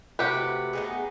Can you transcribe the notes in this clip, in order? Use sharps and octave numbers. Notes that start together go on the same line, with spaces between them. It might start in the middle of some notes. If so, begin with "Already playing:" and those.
C3 A3 F#4 G4 B4 F#5
B3 D#4 G#4